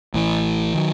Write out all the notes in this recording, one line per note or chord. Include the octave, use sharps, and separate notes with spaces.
A1 A2 E3
D#3 F#3